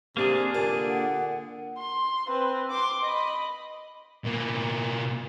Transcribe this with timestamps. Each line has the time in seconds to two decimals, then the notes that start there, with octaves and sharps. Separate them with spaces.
0.17 C3 A#3 D4 G4 G#4
0.55 A#2 D3
0.89 F#5
1.78 C6
2.27 C4 B4
2.70 C6 D6
3.03 D#5 B5
4.25 B2 A#3